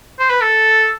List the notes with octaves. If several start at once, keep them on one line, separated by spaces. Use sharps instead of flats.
C5
B4
A4